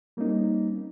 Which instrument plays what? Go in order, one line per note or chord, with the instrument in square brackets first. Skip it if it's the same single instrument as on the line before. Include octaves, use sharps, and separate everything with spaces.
[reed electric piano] G3 A#3 C4 C#4 D#4